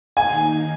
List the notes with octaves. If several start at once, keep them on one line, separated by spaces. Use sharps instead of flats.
D#2 D#3 A#3 D#4 G#5